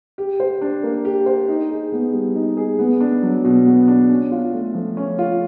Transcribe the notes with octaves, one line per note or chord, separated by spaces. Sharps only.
G4
C5
D4
A#3
G4
C5
D#4
G#4
B3
G3
D#4
G#4
B3
D4
F#3
B2
B3
D4
C#4
F4
A3
F3
C#4
F4